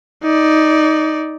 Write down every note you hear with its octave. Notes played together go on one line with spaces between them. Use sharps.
D#4 D5